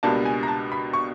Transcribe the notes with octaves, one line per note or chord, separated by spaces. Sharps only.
C#2 B2 G3 A#3 D4 A5
G#5
A#5
A5
B5
C#6